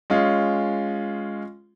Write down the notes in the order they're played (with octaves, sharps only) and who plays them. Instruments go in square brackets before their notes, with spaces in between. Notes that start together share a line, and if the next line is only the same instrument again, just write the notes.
[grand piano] G#3 C#4 F4